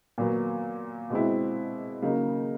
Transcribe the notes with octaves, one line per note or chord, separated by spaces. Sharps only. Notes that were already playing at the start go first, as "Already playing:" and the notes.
A#2 F#3 B3
B2 G#3 C4 E4
C#3 F#3 A#3 D#4